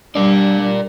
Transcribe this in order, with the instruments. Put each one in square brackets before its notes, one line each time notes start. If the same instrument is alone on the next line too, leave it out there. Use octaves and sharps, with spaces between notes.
[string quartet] G3 [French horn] D4 [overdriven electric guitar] A#4 D5